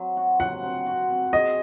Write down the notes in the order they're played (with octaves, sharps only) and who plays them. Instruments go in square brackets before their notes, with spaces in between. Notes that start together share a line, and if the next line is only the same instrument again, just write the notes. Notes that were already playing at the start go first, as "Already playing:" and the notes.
Already playing: [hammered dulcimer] F#3 C4
F#4
[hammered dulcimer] F#3 [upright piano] F#5
[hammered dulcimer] C4
F#4
C4
[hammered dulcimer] G#4 [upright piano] D#5